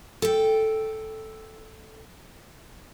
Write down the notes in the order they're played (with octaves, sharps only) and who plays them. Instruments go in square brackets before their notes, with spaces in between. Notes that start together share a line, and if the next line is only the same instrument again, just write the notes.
[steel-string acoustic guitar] A4 G5